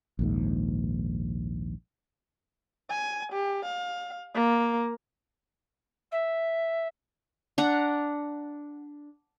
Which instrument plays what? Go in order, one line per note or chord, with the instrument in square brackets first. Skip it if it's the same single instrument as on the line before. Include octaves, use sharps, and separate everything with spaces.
[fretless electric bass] A#1 D#2 G#2
[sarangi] G#5
G4
F5
A#3
[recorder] E5
[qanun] D4 F#5 A#5